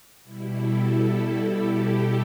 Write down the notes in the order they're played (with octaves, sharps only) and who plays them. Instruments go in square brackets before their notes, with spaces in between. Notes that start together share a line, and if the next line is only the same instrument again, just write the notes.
[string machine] B2 G3 E4
A4
A4
A4
G4